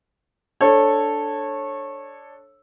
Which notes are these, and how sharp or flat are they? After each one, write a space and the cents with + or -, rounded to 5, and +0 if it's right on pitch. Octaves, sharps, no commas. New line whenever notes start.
D4 +0 A4 +0 C#5 -20